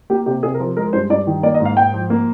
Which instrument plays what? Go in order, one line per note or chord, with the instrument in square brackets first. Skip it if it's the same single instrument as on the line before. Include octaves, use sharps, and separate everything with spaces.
[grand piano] A#3 G4
C3 G4
C3 G#4
A#4
F3
G#3 A#4
G2 C5
G2 D5
D#3
A#3 D5
D#5
G#2
F5
G#2 G5
F3
A#3